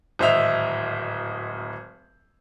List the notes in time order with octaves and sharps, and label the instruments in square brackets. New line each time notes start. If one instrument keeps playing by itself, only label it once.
[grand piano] D1 G#1 C5 D#5 E5 F7